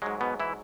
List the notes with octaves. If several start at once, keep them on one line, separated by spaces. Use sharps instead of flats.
G#2 F#3 G#3
B2 B3
E3 E4